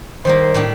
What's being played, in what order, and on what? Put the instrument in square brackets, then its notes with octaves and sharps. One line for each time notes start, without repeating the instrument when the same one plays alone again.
[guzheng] D#3 G3 A#3 [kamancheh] C5
[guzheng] A2 G3 D4 A4